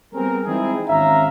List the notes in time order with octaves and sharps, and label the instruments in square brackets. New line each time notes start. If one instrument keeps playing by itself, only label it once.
[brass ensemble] G3 B3 C4 G#4 A#4
E3 G#3 C4 D#4 E4 G#4
G#1 C#4 E5 F5 A#5